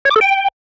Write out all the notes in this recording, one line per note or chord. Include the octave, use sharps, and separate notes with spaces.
C#5
D6
A4
G5